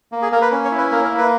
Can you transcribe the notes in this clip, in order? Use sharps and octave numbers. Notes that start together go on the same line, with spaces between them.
A#3
G#4
A#3 A#4
B4
C#4
C#5
E4
B4
A#3 A#4
A#4
A#3
B4